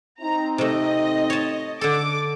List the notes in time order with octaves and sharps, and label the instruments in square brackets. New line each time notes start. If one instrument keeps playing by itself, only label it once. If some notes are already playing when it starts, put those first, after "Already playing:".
[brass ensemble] C4 D#4 [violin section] A#5
[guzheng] C3 A3 [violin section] D#5
[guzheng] C#5 A5
[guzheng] D3 A4 [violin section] D6